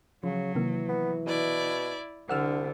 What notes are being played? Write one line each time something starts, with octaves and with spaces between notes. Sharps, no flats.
C#3 F3 F#3
C3 D#3 E3 A#3
B3
B2 E4 D5
C2 D3 D4 F#5 E6 F6